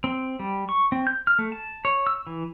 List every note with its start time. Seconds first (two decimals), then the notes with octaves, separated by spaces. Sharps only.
0.04 C4
0.39 G3
0.69 C#6
0.92 C4
1.07 G6
1.27 F6
1.39 A3
1.52 A5
1.85 C#5
2.07 E6
2.27 E3